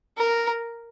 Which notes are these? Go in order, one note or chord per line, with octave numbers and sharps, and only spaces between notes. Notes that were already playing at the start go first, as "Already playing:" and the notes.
A#4